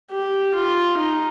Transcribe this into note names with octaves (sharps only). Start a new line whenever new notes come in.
G4
F4
D#4